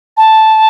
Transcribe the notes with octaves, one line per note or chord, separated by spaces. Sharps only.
A5